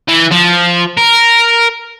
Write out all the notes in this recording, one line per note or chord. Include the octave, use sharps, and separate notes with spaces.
E3
F3
A#4